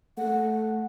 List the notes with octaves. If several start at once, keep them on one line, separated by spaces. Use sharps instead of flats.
A3 F#5